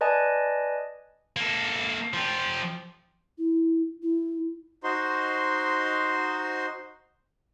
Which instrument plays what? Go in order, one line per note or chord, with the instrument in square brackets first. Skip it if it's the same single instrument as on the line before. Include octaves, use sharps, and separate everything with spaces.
[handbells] B4 D5 D#5 G#5 A5
[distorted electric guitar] A#3 A4
F3 G4
[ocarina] E4
E4
[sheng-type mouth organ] D#4 F#4 C5 C6